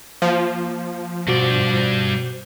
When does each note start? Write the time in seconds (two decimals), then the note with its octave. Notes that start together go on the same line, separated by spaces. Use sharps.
0.22 F3 A#3
1.28 G2 B2 F#4 C5 D5